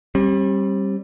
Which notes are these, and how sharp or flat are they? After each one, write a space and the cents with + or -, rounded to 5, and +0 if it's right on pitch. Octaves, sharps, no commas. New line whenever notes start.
G3 +0 C4 +45